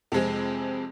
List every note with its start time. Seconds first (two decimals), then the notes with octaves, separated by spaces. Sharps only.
0.12 F2 C3 G#3 C4 G#4